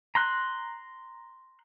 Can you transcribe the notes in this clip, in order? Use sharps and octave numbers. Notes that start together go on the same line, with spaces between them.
A#5 C6 F#6